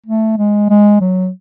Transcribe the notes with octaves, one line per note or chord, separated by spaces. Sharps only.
A3
G#3
G#3
F#3